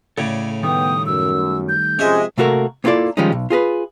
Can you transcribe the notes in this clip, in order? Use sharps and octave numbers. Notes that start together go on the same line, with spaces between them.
A2 C#3 A4 C#5 D5
D#3 G3 A3 B3 G5 D#6
F#2 E6
G6
C3 F3 G#3 C#4 G#4 D#5 E5
C3 A3 A#3 F#4 A4 A#4
A#3 B3 E4 F4 A4 D5
D#3 F3 G3 G#3 C#4 D#4
B1
F4 G#4 A#4 B4